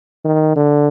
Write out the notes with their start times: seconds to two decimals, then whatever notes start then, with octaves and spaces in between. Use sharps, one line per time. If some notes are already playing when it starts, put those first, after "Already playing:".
0.25 D#3
0.56 D3